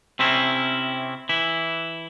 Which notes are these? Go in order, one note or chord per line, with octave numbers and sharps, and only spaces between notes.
C3 C4 C#4 E4
E3 E4